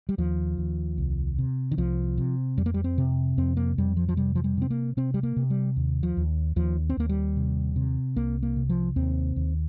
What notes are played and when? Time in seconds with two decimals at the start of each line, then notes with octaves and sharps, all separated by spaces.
0.09 G3
0.18 D#2 F3
0.57 D#2
0.98 C2
1.39 C3
1.71 D#3
1.77 C2 F3
2.18 C3
2.57 F2 G3
2.66 A#3
2.74 G3
2.84 C4
2.98 C3
3.37 F2 C4
3.57 A#3
3.78 F2 G3
3.97 F3
4.09 F3
4.17 C3 G3
4.35 F3
4.44 G3
4.57 C3 C4
4.70 A#3
4.97 C3 C4
5.14 G3
5.23 A#3
5.36 C3
5.50 G3
5.76 D#2
6.03 F3
6.17 D#2
6.56 D#2 F3
6.90 C4
6.97 D#2 A#3
7.09 G3
7.36 C3
7.76 C3
8.16 C2 A#3
8.43 A#3
8.56 C3
8.70 F3
8.96 D#2 C4
9.36 D#2